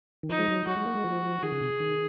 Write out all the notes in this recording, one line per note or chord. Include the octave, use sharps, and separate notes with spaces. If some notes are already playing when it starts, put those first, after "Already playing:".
D#3
F3 D#4
G#3
F#3
F#3 F#4
G#3
A#3
G#3
F3
D#3 G#4
C#3
C3
D#3